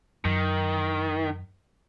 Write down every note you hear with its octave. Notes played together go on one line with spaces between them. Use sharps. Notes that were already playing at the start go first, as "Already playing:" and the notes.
F#2 D#3